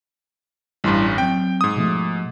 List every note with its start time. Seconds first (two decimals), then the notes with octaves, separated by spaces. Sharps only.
0.84 A1 G2 G3 E4 C6
1.18 F#3 C4 G5
1.61 G#2 D#6
1.76 B2 F3 A3